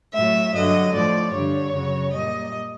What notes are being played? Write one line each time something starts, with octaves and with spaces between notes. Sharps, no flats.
A2 F#3 E5
G2 D3 F#3 D#5
A2 F3 D5
G2 D3 G3 C#5
F#2 C#3 F#3
A#2 G3 D#5